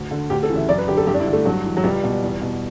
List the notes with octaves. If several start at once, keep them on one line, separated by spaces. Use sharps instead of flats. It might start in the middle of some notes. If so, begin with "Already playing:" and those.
Already playing: D2
D3
D2 G4
A4
C#3 E3
E5
F#2 D5
B4
D3 G4
A4
G2 G4
D4
E4
D3
A3
G2 F#3
E3
F#3
C#2 G3
B2
E2
B2